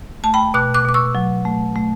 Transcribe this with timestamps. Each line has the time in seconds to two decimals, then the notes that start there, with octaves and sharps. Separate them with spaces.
0.24 A3 A5
0.34 G5 B5
0.54 B2 D6 F#6
0.74 D6 F#6
0.85 B2 D6
0.94 C#6 E6
1.15 F#3
1.45 A3
1.76 A3